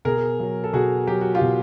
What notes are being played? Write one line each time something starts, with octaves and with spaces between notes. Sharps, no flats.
B2 G#4 A#4
F#3
A4
B2 F#4 G#4
F#3 G4
F#4
F4 G4
B2